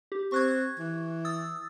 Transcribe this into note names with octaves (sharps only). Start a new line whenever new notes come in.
G4
C4 C#6 F#6 G#6
E3
D#6 E6 A6